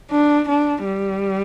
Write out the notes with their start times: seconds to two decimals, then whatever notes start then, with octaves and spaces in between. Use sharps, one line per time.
0.11 D4
0.48 D4
0.84 G3